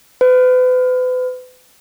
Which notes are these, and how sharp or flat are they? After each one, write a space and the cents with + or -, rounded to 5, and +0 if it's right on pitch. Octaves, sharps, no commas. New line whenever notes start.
B4 +40